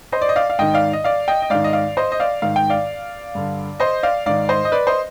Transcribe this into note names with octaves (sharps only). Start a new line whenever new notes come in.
C5 D#5
D5
D#5
D5 F5
F5
G#2 D#3 D#5 G5
D5 F5
D#5
D5 F5
D#5 G5
D#5
G#2 D#3 D5 F5
D#5
D5 F5
C5 D#5
D#5
D5 F5
G#2 D#3 F5
G5
D5 F5
G2 D3
C5 D#5
D5 F5
G#2 D#3 D5 F5
C5 D#5
D#5
B4 D5
C5 D#5